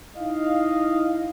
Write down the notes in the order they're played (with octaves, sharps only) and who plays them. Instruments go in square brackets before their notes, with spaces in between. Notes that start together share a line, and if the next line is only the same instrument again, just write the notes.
[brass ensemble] D#4 E4 D#5 F5